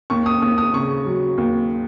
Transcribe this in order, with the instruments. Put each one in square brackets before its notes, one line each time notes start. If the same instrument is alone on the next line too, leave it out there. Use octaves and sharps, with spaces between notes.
[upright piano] D#2 C#6
D#6
D#2 D#6
D#6
C#3 C#6
F#3
D#2